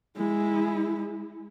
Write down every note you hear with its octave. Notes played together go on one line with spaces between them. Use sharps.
G#3 E4